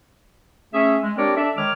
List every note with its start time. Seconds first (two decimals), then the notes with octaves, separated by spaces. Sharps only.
0.74 A3 C#4 G#4 E5
1.03 G#3
1.17 C4 D4 G4 A#4 C#5 D5
1.36 D4 A4 D5 E5
1.57 D#3 G#3 C#5 D6 F6